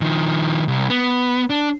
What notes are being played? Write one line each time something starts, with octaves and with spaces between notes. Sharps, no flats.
D#3 F3
C2
B3
D4